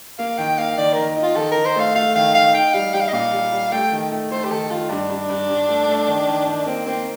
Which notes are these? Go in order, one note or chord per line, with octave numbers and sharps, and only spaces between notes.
A#3 F5
D#3 G5
A#3 F5
D#3 D5
D#3 A#4
D#4
F4
D#3 A4
D#3 A#4
C5
A3 F5
A3 F5
D#3 F5
D#3 F5
D#4 G5
G3 F5
G3 G5
F5
D#5
A#2 F5
G3
G3
A3 G5
D#3
A3
A3 C5
G4
D#3 A4
D#3 F4
G2 D4
G2
G2
G2
A3
A3
D#3
D#3
D#3
A#3 C4
A#3 C4